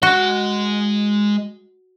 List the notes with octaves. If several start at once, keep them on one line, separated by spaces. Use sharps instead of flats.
G#3 F#4 D#5